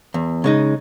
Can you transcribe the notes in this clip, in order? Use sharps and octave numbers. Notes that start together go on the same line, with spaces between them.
E2
C#3 G#3 D#4